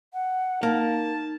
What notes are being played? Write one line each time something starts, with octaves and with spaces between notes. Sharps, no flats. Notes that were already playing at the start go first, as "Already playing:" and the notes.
F#5
A#3 D#4 A5